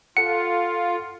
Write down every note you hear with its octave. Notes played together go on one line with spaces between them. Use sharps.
F4 A4 F#5 C#7